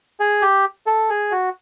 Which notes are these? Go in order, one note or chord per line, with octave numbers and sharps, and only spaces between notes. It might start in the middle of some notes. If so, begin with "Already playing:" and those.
G#4
G4
A4
G#4
F#4